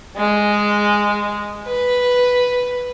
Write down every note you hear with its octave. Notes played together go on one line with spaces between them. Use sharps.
G#3
B4